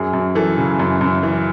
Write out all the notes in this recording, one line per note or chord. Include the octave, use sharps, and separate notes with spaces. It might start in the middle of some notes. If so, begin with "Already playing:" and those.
Already playing: F#2 G#4
F#2
E3 A4
C#3
F#2
F#2
E3